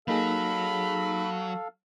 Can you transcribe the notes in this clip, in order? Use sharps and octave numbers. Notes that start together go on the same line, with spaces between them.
F#3 A#3 D#4 G#4 A4 F5 B5